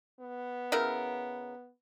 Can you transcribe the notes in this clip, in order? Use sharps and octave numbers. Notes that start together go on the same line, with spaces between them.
B3
C#3 E4 A#4